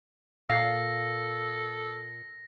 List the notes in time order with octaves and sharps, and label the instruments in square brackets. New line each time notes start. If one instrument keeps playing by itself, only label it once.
[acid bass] A#2 [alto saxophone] A4 [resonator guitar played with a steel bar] F5 [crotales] A#6